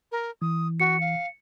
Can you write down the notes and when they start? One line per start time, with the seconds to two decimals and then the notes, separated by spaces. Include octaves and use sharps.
0.12 A#4
0.42 E3 D#6
0.80 F#4 C#7
1.00 F5